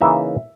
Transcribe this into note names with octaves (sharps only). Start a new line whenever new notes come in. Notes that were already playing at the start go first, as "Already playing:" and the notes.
C#3 E3 A#3 D#4 E5